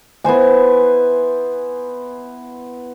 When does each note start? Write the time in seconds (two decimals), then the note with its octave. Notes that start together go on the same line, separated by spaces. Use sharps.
0.24 B3 E4 C5 G#5